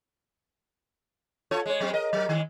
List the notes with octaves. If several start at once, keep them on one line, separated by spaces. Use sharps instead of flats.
F4 A4 C#5
G#3 C#5
F#3 G#3 C4
A#4 D#5
F#3 A#4
D#3 G#3